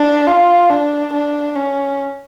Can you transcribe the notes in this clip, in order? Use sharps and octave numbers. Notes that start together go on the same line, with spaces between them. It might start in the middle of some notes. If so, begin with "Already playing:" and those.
Already playing: D4
F4
D4
D4
C#4